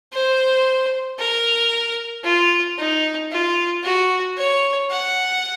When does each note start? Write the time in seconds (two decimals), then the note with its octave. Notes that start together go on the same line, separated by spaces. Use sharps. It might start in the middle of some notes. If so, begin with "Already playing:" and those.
0.13 C5
1.19 A#4
2.24 F4
2.78 D#4
3.31 F4
3.83 F#4
4.37 C#5
4.90 F#5